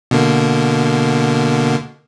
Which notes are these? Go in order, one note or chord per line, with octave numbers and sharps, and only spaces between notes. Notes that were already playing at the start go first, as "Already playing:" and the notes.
B2 D3 A#3